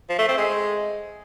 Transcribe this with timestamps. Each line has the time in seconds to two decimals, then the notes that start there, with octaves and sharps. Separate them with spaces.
0.09 F3
0.19 A3
0.28 C4
0.38 G#3